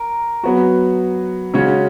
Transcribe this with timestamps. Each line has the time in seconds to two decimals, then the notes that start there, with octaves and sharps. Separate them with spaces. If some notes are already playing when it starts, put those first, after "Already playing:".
Already playing: A#4
0.43 F#3 B3 F#4
1.54 C#3 G#3 C#4 F#4 C#5